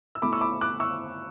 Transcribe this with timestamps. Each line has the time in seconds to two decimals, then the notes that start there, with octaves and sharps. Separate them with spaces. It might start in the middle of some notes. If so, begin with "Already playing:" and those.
0.15 E6
0.22 B2 A3 E4 B5 D6
0.32 C#6 E6
0.41 B5 D6
0.61 D6 F#6
0.80 C#6 E6